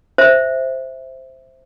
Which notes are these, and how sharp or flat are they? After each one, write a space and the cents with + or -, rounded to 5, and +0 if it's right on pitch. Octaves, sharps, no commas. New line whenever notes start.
C5 +0 E5 +0